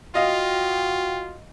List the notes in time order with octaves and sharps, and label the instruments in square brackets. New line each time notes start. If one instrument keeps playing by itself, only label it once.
[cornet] F4 [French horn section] F#4 [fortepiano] D#5 F5 [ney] G5